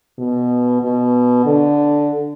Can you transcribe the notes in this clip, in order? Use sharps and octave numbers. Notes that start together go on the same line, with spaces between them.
B2
B2
D3